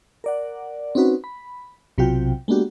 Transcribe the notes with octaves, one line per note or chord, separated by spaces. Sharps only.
A#4 D5 F#5
C4 C#4 D#4 F#4 B4
B5
B1 C3 F#3 F4 F#4 G5
G#3 A#3 B3 D4 F#4 G4